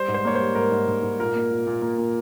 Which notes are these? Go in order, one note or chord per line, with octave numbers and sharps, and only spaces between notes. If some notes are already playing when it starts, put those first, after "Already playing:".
Already playing: G3 C5
G#2
C5
A#3 C#5
G3 C5
G#2 A#4
G#2
G#2
G#2
A#2 A#4
A#3
A#2
A#2
A#3
A#2